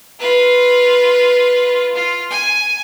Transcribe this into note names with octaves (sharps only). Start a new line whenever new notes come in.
F4 B4
F4
G#5